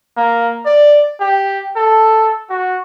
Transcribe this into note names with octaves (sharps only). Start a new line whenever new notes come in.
A#3
D5
G4
A4
F#4